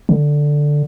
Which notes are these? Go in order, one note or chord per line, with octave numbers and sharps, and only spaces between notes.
D3